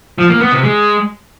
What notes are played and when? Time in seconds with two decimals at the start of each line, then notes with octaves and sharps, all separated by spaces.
0.18 F3
0.30 A#3
0.41 B3
0.52 C3
0.63 G#3